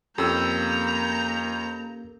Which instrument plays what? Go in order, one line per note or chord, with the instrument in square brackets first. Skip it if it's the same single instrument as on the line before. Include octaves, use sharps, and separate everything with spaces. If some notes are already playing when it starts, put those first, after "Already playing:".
[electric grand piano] F2 E6 [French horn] A#3 [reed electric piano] C#4 G4 A4 [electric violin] A#5 G6